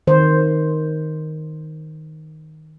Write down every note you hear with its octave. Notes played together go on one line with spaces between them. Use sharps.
D#3 C5